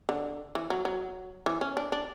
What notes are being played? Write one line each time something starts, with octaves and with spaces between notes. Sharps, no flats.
D3
E3
F#3
F#3
E3
C#4
D4
D4